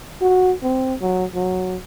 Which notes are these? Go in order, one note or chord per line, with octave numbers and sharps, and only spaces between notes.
F#4
C4
F#3
F#3